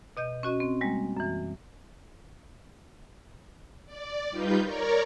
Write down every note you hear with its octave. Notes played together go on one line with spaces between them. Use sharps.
B2 D#5 G6
C#4 F#4 D#5
C4
G3 G#3 A#3
F#2 E3
D5
G3 D#4 F4 B4 G6
A#4 C#5 D5 A#5